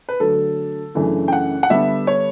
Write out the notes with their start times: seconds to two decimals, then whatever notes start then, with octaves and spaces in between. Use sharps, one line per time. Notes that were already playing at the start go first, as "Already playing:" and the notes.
0.09 B4
0.20 D3 F#3 A3 A4
0.95 F#2 C#3 E3 A3 D4
1.28 G5
1.33 F#5
1.63 F#5
1.70 D3 G3 B3 D4 E5
2.07 C#5